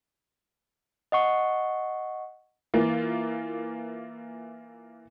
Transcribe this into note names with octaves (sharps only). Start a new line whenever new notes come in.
D#5 F#5 C#6
E3 A#3 F4